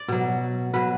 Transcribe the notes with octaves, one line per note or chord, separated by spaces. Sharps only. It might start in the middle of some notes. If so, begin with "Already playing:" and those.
Already playing: D5
B2 F#3
B2 F#3 B4